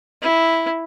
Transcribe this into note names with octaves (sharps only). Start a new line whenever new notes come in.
E4